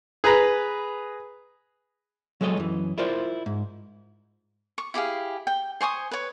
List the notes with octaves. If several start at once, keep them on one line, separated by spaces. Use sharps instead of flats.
G#4 B4 A#5 B5
F#3 G#3 A4 C#5 D#5
F#2 E3
E4 F4 A#4 C5 D5
G#2
C#6
E4 G4 G#4 F5
G5
C5 G#5 C#6 D#6
B4 C#5